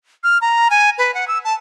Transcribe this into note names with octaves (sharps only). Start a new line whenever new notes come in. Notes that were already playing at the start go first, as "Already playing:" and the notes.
F6
A#5
G#5
B4
F#5
E6
A5